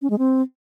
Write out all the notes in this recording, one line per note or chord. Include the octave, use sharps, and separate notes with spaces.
C#4
G#3
C4